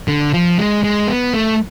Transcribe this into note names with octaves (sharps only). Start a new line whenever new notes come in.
D3
F3
G#3
G#3
B3
A3